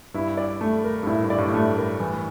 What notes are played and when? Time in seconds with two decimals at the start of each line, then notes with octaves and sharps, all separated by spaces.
0.14 G2 E4
0.37 D5
0.61 A3
0.84 A#4
1.03 G2
1.07 A2 E4
1.23 G2
1.30 D5
1.38 G2
1.48 A2
1.53 G2 A3
1.77 A#4
2.00 E3